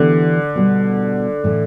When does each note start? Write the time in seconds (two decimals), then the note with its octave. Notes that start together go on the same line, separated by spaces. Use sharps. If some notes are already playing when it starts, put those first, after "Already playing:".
Already playing: D3 E3 B3 D4 G4
0.55 B2 G3 B3
1.44 A2 E3 A3